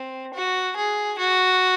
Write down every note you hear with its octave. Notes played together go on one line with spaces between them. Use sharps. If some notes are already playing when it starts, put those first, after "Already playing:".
Already playing: C4
F#4
G#4
F#4